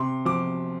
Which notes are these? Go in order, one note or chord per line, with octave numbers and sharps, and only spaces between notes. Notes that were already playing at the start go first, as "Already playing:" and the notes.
Already playing: C3 C6
F3 D6